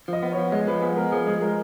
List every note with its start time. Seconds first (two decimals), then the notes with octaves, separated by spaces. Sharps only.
0.08 F3 D#5
0.23 B3
0.32 C#5
0.37 F3
0.52 G#3 D#5
0.67 F3 B4
0.81 B3 G#4
0.97 G#3 A#4
1.11 F3 G#4
1.27 G#3 G#4
1.41 G#3 A#4